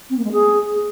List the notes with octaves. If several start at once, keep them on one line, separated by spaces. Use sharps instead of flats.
C4
A#3
G#3
G#4